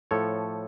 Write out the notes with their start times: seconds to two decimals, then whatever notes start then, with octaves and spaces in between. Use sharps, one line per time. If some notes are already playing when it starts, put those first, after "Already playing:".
0.11 A2 F3 A4 C#5